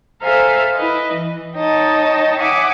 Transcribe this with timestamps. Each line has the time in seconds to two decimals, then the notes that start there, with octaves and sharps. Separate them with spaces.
0.22 A4 C5 E5 F5 G#5 A#5
0.75 E4 B4 D#5
1.12 E3
1.56 D#4 C#5 D#5 G5 A5
2.38 C#5 E5 F#5 G#5 D6 D#6